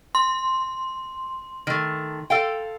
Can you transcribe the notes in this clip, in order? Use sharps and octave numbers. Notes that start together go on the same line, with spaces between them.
C6
D#3 A3
A4 F5 G5